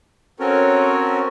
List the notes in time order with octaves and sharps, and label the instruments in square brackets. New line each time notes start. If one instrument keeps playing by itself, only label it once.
[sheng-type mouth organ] C4 C#4 F#4 A4 A#4 C#5